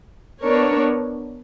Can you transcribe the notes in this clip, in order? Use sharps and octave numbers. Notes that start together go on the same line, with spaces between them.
B3 D4 A#4 C#5